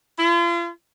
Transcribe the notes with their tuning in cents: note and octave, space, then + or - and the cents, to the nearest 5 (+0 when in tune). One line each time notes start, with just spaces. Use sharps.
F4 -40